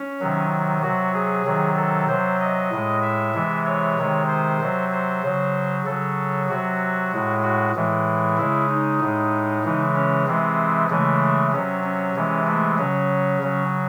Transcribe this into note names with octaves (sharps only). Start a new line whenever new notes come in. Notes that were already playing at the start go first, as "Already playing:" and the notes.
Already playing: C#4
C3 D#3 F#3
C3 F#3 F#4
G#4
C3 D#3 F#3
A4
C3 F#3 C5
D#5
A2 G#3
E5
C3 E3 G#3
C#5
C3 D#3 G#3
C5
C3 F#3
C5
C#3 F#3
C#3 F#3 A4
C3 F#3 F#4
A2 G#3
F#4
A2 E3 G#3
C#3 G#3 E4
D#4
A2 G#3
C#3 E3 G#3
C#4
C3 E3 G#3 C4
C#3 E3 G#3 A3
C3 F#3 C#4
C#4
C3 E3 G#3
A3
C#3 F#3 C#4
C#3 F#3